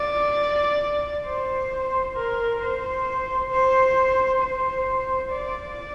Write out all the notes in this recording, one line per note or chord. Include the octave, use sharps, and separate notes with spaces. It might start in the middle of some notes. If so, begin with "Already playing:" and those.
Already playing: D5
C5
A#4
C5
C5
C5
D5